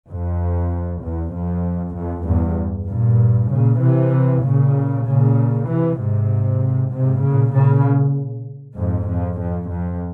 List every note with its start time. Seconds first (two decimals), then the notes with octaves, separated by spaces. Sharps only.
0.10 F2
1.03 E2
1.34 F2
1.96 F2
2.27 E2 G2
2.89 G2 A#2
3.51 A#2 C#3
3.82 C3 E3
4.44 A#2 C#3
5.06 A#2 C#3
5.68 C3 E3
5.99 G#2 C3
6.92 G#2 C3
7.23 A#2 C#3
7.54 A#2 C#3
8.78 F2 G#2
9.09 F2
9.40 F2
9.71 F2